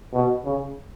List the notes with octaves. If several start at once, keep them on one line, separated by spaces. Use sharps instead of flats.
B2
C#3